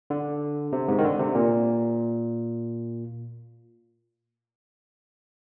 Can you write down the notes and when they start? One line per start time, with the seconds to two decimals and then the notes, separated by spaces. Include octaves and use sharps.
0.10 D3
0.72 C3
0.88 G#2
0.98 D#3
1.04 D3
1.19 C3
1.35 A#2